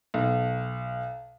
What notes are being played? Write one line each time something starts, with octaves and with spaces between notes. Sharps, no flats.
B1